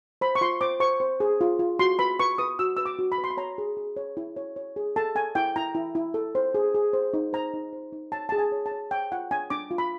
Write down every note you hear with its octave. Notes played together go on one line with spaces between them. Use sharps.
C5 B5
C#6
F4 C6
C5 D6
C5 C#6
C5
G#4
F4
F4
F#4 C6
B4 B5
B4 C#6
B4 D#6
F#4 E6
B4 E6
D6
F#4
B5
B4
C6
B5
C#5 A#5
G#4
G#4
C#5
E4
C#5
C#5
G#4
A4 A5
A4 G#5
E4 G5
E4 A#5
E4
E4
A4
C5
G#4
G#4
C5
D#4
C5 A#5
D#4
C5
D#4
C#5 A5
G#4 A5
G#5
C#5
A5
C#5
C#5 G5
F4 F#5
D4 G#5
D4 D6
F4
B5